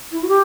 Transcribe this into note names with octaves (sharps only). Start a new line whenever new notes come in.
E4
F#4
G4